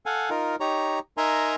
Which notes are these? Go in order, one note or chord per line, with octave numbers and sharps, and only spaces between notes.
A4 F5 F#5 G#5
D#4 F4 A#4
D#4 G4 C#5 A#5
D#4 A#4 E5 G#5 A#5 C6